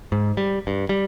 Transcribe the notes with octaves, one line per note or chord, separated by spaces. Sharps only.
G#2
G3
G2
G3